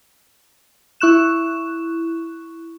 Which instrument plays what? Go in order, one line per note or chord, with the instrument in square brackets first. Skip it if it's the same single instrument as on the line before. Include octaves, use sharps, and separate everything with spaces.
[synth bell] E4 C#6 F#6 E7